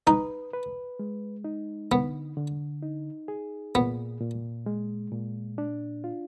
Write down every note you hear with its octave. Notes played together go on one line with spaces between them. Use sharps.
D#4 B4
B4
G#3
D#4
D3 B3
D3
D#4
G#4
A#2 B3
A#2
G#3
A#2
D4
F4